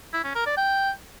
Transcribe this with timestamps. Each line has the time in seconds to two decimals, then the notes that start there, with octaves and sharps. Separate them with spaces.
0.13 E4
0.24 C#4
0.35 A#4
0.46 D5
0.57 G5